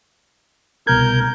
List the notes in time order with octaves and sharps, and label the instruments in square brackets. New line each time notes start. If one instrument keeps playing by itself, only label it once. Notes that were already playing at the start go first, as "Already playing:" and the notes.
[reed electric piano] C2 B2 G#6 [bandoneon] A#4 G6